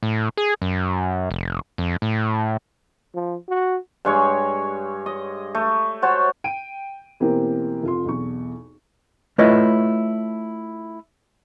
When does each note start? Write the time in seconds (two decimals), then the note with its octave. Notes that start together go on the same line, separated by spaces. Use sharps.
0.03 A2
0.37 G#4
0.62 F#2
1.31 F1
1.78 F2
2.02 A2
3.15 F3
3.49 F#4
4.05 G2 G#3 C#5
5.06 D#5
5.55 A3
6.02 F#4 C5 C#5 A5
6.44 G5 D7 D#7
7.20 B2 E3 A#3 C4 G4 A#4
7.83 F1 F4 C6
8.05 B1 E2 C#6
9.38 A3 E4 F4 B4 C#5 D#5